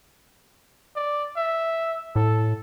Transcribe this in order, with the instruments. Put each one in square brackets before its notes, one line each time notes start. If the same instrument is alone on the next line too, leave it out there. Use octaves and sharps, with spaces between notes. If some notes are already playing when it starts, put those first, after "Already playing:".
[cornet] D5
E5
[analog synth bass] A2 [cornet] A4